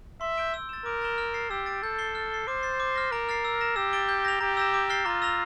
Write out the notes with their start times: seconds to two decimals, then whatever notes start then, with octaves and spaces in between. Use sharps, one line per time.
0.21 E5 C6
0.37 G6 D7 G7
0.54 E6
0.69 A6 E7
0.86 A#4 D6
1.01 A6 E7 G7
1.18 F6
1.34 A6 C7
1.51 G4 E6
1.66 A6 D7
1.83 A4 G6
1.98 C7 G7
2.15 F6
2.32 C7 G7
2.47 C5 D6
2.63 A6 C7
2.80 D6
2.95 F6 A#6
3.12 A#4 A#5
3.29 F6 A6 C7
3.45 E6
3.61 A#6 E7
3.76 G4 E6
3.93 A6 D7 G7
4.09 G6
4.25 A#6 F7
4.41 G4 A#5
4.57 E6 A#6 E7
4.74 D6
4.90 F6 A6 C7 G7
5.06 F4 A#5
5.22 E6 A#6 F7